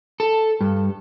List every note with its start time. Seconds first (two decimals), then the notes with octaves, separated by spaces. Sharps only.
0.20 A4
0.61 G2